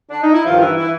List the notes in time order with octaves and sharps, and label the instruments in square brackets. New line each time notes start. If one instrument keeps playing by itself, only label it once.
[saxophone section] D4
D#4
E4
G2 D#3 F3 F4
E3 E4
E3 E4